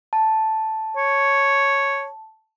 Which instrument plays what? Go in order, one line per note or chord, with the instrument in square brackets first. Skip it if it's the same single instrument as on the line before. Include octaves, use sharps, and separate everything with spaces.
[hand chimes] A5
[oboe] C#5